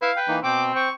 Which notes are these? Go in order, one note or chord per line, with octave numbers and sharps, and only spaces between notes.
E4 B4 F5
B4 G5
E3 A#3 D#4
B2 C4 G5 D6
C5 G5 C#6